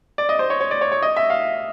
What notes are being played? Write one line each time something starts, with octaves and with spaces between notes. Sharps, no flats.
D5
D#5
C5
C#5
C#5
D5
C#5
C#5
D#5
E5
F5